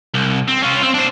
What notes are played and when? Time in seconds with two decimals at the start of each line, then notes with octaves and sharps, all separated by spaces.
0.14 C2
0.48 C4
0.62 C#4 F4
0.82 C4
0.94 D4 C5